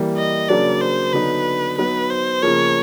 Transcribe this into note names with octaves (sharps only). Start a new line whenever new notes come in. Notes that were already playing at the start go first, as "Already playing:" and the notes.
Already playing: E3 G3 A#3
D#5
C#3 F#3 A#3 D4 D5
C5
D3 F#3 B3 D#4 B4
F#3 B3 D#4 B4
C5
C#3 F3 A#3 C#5